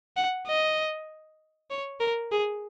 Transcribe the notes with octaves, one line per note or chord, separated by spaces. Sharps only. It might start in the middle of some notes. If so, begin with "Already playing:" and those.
F#5
D#5
C#5
A#4
G#4